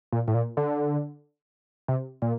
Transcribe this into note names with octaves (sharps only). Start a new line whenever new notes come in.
A#2
A2
A#2
D3
C3
A#2